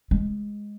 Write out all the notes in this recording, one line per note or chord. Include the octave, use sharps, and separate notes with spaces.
G#3